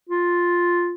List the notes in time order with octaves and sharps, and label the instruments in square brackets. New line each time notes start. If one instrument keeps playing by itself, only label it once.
[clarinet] F4